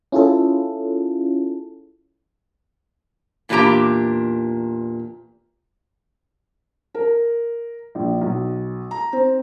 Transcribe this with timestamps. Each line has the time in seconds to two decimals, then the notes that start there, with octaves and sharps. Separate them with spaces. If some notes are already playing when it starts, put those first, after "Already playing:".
0.12 C#4 E4 F4 G#4 A4
3.49 E2 A#2 D4 D#4 G4 A#5
6.94 A#4
7.95 A#1
8.21 B1
8.91 A#5
9.13 C4